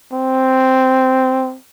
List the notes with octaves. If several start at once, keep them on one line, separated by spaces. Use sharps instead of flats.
C4